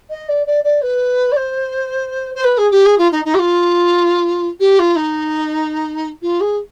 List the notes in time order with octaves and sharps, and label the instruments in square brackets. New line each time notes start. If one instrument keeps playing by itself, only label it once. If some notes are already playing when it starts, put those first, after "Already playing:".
[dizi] D#5
D5
D5
D5
B4
D5
C5
C5
B4
G#4
G4
G#4
F4
D#4
D#4
G4
F4
G4
F4
D#4
F4
G#4